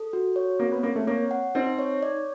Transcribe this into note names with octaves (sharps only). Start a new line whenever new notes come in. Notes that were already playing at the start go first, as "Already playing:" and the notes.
Already playing: A4
F#4
C#5
A#3 C4
B3
A#3 C4
A3
A#3 C#5
F#5
C4 D#4
C#5
D5